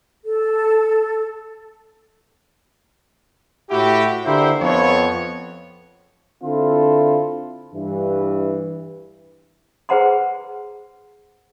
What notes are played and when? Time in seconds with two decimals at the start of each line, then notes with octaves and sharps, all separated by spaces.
0.25 A4
3.70 A2 E4 F#4 G4
4.25 D3 A#3 E4 G4 C5
4.60 F2 B3 C#5
6.43 D3 C4 E4 F4 A4
7.73 G2 E3
9.89 G#4 B4 C5 F#5 A#5 C6